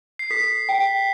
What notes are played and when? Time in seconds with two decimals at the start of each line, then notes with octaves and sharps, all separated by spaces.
0.19 C7
0.31 A4 B6
0.69 G5